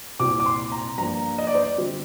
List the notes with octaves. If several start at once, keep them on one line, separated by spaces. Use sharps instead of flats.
C2 A#2 G3 C4 D6
D6
C6
A#5
G2 F3 A#3 A#5
D#5
D5
C5
D5
D3 G3 C4